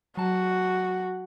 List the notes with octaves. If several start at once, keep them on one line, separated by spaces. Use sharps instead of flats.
F#3 F#4 A5